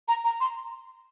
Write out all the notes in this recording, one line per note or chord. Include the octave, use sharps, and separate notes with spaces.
A#5
A#5
C6